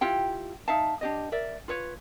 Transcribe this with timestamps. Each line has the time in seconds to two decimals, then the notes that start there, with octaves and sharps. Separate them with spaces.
0.01 E4 F4 G4 G5
0.68 D#4 E5 F5 A5
1.01 D4 G4 D#5
1.32 A#4 D5 E5
1.68 F4 B4 C#5